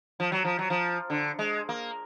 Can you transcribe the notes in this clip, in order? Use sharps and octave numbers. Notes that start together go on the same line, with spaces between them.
F3
F#3
F3
F#3
F3
D3
G#3
A#3